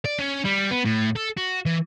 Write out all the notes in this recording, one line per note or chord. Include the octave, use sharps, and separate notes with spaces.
D5
C#4
G3
B3
A2
A4
F#4
E3